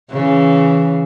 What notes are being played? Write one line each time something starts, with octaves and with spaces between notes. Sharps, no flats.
C#3 E3